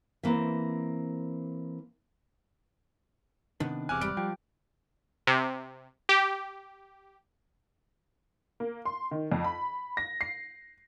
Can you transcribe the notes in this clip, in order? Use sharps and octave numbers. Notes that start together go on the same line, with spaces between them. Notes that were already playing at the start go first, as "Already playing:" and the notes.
E3 A#3 C4 E5
C3 D#3 B3 D4
E1 E2 C3 G#5 D6 F6 F#6
G3 D7
F3 G5
C3
G4
A#3
C6
D#3
F2
B5
A#6
C7